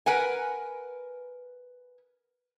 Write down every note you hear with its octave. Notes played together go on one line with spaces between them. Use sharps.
A#4 B4 F#5 G#5